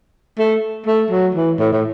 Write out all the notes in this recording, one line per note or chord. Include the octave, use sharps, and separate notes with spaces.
A3
A3
F#3
E3
A2
A2